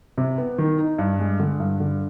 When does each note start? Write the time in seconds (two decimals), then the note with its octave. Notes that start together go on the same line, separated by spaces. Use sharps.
0.18 C3
0.38 B3
0.58 D#3
0.78 D#4
0.98 G2
1.19 G#3
1.40 D3
1.60 G2
1.80 D3